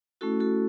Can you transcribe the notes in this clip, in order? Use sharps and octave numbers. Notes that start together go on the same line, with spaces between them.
A3 C#4 E4 F#4 A4
F#4 A4